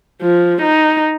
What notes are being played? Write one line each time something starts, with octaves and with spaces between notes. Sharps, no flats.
F3
D#4